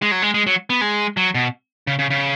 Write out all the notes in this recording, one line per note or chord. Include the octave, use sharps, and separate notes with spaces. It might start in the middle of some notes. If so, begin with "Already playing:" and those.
G#3
F#3
G#3
G#3
F#3
B3
G#3
F#3
B2
C#3
C#3
C#3